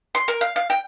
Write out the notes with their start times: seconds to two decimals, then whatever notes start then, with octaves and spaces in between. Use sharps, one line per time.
0.15 C6
0.28 A#4
0.41 F5
0.56 F5
0.70 G5